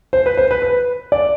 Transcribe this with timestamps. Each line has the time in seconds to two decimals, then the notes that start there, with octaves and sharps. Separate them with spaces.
0.13 C5
0.26 B4
0.37 C5
0.51 B4
0.62 B4
1.12 D5